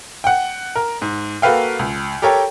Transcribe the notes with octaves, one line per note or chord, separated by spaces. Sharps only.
F#5 G5
A#4
G#2
A#3 F#4 A4 B4 F5 G5
C#2
G4 A4 A#4 C#5 G5